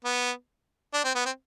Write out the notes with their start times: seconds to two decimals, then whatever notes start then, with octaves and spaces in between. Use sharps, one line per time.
0.04 B3
0.94 D4
1.04 C4
1.15 B3
1.25 C4